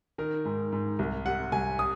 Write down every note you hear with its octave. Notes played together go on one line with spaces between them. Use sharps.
D#3 A#4
G#2
G#2
C2
C3 F#5
C2 G#5
D#6